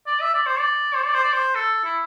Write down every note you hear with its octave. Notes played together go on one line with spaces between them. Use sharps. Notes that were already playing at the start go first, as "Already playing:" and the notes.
D5
E5
D5
C5
D5
C5
D5
C5
D5
C5
A4
E4